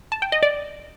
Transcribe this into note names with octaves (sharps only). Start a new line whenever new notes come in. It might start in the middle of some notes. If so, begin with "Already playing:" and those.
A5
G5
D#5
D5